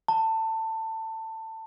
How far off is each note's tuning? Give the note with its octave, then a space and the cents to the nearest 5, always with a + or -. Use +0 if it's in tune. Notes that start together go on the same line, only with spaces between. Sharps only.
A5 +20